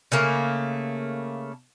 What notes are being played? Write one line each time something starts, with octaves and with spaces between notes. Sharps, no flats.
C#3 A3 A#3